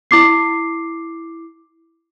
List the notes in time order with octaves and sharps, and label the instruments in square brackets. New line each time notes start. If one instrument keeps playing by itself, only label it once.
[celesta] E4 D6 C7